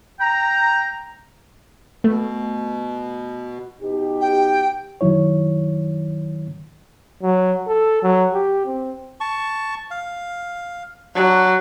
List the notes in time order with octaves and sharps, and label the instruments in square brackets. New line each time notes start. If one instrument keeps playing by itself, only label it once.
[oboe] G5 [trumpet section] A#5
[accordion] B2 [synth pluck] A3
[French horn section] B2 D#4 G4
[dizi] G5
[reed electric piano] F#2 D#3 F#3 E4 C#5
[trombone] F#3
A4
F#3
G4
C4
[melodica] A5 C#6
F5
[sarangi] F#3 [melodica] D4